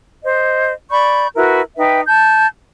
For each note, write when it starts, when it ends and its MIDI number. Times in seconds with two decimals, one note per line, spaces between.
0.24 0.73 72
0.24 0.73 75
0.91 1.27 74
0.91 1.27 83
0.91 1.27 85
0.91 1.27 91
1.36 1.61 64
1.36 1.61 66
1.36 1.61 70
1.36 1.61 71
1.77 2.01 63
1.77 2.01 71
1.77 2.01 76
1.77 2.01 79
2.08 2.47 81
2.08 2.47 91